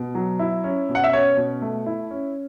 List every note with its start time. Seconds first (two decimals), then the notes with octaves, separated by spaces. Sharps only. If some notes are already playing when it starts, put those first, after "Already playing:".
Already playing: B2
0.15 F#3
0.39 E4
0.64 C#4
0.89 B2
0.95 F#5
1.04 E5
1.13 C#4 C#5
1.37 B2
1.62 A3
1.86 E4
2.11 C#4